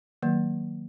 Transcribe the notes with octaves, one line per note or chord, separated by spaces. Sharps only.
D#3 F#3 A#3